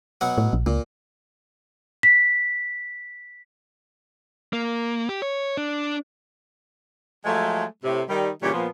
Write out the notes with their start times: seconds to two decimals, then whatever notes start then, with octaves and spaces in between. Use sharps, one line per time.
0.21 B2 F#3 F#5
0.38 A2
0.53 A#1
0.66 C#2 A#2
2.03 B6
4.53 A#3
5.09 G4
5.22 C#5
5.57 D4
7.25 F3 F#3 G#3 A3
7.83 A2 C3
8.09 D#3 G3 D#4
8.41 A#2 C#3 E3 G3 G4 C#5
8.53 A#2 F3 B3